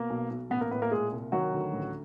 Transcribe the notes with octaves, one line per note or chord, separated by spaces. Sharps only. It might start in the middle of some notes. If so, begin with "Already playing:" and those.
Already playing: B2 A#3 A#4
B1
B1
A1 B3 B4
A#3 A#4
A2 B3 B4
A#3 A#4
A#2 G#3 G#4
C2
D#3 F#3 F#4
D2
A1